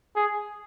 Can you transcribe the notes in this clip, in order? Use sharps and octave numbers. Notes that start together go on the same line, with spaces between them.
G#4